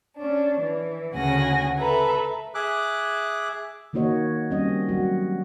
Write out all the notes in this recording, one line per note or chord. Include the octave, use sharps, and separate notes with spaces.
C#4 D4
E3
D2 C#3 F#5 G#5 A#6
A4 B4 E5 A#5
G#4 E5 D6 F#6
D#3 A#3 D#4 F#4 C#5 D#5
G3 C4 C#4 D#5
F#3 F#4